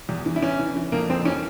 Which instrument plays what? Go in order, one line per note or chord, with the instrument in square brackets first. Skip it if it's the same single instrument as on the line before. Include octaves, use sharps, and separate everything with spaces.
[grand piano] E2
E3
E4
E3 C#4
E3
E3
F2 A#3
F2 C4
E3 C#4